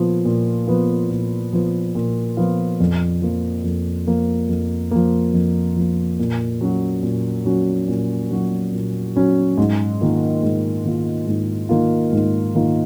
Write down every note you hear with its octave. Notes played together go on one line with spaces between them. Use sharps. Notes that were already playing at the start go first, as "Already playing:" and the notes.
Already playing: A#2 F3 B3 F4
A#2
F3 B3 F4
A#2
F3 B3 F4
A#2
F3 B3 F4
F2
F3 A#3
F2
F3 A#3
F2
F3 A#3
F2
F3 A#3
A#2
F#3 C#4 F#4
A#2
F#3 C#4 F#4
A#2
F#3 C#4 F#4
A#2
F#3 C#4 F#4
G#2
D#3 A#3 F4
G#2
D#3 A#3 F4
G#2
D#3 A#3 F4
G#2
D#3 A#3 F4